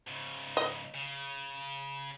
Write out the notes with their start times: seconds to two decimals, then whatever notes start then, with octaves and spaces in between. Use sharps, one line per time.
0.08 G#2 C#3
0.57 D#5
0.94 C#3